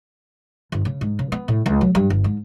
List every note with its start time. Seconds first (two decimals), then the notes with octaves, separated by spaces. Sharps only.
0.72 G1
0.85 C#3
1.01 G#2
1.19 C#3
1.32 B3
1.48 A2
1.66 C#2
1.81 F#3
1.95 G2
2.10 G1
2.24 G#2